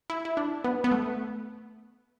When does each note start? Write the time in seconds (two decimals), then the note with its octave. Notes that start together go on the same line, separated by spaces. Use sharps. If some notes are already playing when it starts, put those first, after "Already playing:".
0.10 E4
0.25 E4
0.37 D4
0.64 B3
0.84 B3
0.91 A3